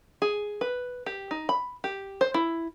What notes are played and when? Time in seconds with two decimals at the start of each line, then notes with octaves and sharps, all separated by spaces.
0.22 G#4
0.61 B4
1.06 G4
1.31 D#4
1.49 B5
1.84 G4
2.21 C5
2.34 E4